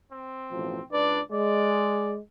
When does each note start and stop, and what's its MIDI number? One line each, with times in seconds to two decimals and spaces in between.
0.12 0.83 60
0.51 0.79 33
0.51 0.79 47
0.51 0.79 53
0.92 1.20 37
0.92 1.20 62
0.92 1.20 71
0.92 1.20 74
1.32 2.18 56
1.32 2.14 74